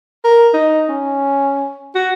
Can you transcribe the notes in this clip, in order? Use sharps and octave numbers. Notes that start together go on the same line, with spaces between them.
A#4
D#4
C#4
F#4